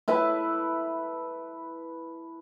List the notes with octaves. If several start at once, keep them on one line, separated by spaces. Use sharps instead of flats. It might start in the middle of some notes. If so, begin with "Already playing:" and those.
E4 B4 E5 A5